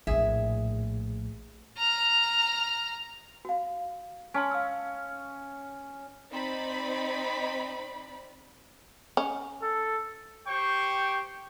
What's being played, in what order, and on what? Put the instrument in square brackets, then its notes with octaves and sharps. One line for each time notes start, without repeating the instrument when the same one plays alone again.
[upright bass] A#1 A2 [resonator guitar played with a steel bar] G#4 E5
[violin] A#5 F6
[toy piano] F#4 F5
[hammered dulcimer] C#4 [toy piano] G#5 A5 C6
[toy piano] F5 E6
[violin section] C4 D#4 D5 B5
[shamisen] C#4
[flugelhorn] A4
[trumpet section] G4 C5 G5 C#6